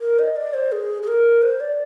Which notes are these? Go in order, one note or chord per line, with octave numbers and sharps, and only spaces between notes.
A#4
D#5
D5
C5
G#4
G#4
A#4
C5
D5